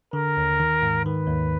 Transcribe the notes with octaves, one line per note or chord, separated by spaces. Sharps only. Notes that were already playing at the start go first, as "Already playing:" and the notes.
D3 A#4
D#2
D#3
G#2
D#3 B4
D#2